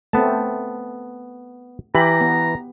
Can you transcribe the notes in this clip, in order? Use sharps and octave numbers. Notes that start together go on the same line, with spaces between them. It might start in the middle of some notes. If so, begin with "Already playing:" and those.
A3 B3 C4 A5
E3 G4 A#5 B5
B3